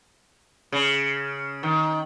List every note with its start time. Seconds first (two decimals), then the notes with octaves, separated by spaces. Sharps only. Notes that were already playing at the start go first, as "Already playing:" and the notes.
0.72 C#3
1.63 D#3